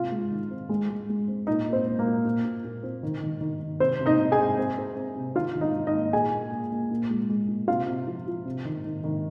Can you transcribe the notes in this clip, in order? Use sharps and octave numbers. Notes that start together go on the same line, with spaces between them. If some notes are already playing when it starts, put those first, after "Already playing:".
Already playing: C3 F4 F5
G#3
D#3
C4
G#3
G#3
G#3
C4
A#2 D#4 D#5
A#3
C4 C5
A#3
A#3 A#4
A#2
A#2
A#2
A#2
C4
D#3
D#3
D#3
D#3
C3 C4 C5
C3
D#4 D#5
C3
G#4 G#5
C3
C4
C4
C4
C3
D#3 F4 F5
D#3
D#4 D#5
D#3
D#4 D#5
A#3
A#2 G#4 G#5
A#3
A#3
A#3
A#2
G#3
G#3
A#2
C3 F4 F5
C3
F3
F3
C3
D#3
D#3
D#3